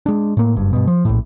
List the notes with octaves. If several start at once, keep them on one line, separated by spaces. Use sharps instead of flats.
G#3 D4
A2 A#3
F#1 G2
G2 B2
F3
A#1 A2